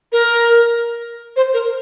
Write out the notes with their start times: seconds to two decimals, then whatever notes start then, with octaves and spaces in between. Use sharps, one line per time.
0.12 A#4
1.36 C5
1.53 A#4